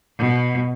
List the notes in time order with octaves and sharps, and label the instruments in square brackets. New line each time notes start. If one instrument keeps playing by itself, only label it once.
[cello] B2